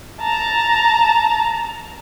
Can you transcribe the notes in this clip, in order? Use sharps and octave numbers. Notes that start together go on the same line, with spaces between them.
A5 A#5